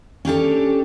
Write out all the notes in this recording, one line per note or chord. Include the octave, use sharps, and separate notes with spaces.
C#4 D4 G4 A4